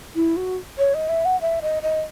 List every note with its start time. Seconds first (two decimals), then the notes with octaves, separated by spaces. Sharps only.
0.15 E4
0.36 F#4
0.78 C#5
0.94 D#5
1.09 E5
1.25 F#5
1.41 E5
1.62 D#5
1.82 D#5